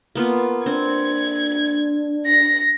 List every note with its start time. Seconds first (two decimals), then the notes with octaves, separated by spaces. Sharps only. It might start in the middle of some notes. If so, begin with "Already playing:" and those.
0.15 A#3 B3 F4
0.66 C4 D4 G#6
2.26 A#6